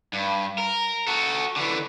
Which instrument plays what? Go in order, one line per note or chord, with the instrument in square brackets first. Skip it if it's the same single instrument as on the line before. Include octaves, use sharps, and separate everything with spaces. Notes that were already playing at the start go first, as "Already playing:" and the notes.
[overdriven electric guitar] G2
A#4
F#4 A4
D3 E3